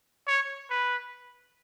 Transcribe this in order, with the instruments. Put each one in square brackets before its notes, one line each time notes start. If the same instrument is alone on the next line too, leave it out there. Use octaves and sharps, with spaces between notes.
[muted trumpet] C#5
B4